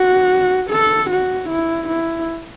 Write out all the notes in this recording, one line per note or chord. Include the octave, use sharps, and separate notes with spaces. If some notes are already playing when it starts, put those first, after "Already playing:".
Already playing: F#4
A4
F#4
E4
E4